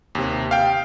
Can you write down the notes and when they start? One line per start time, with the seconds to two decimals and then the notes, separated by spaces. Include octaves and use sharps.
0.15 D#2 C3
0.51 F5 G5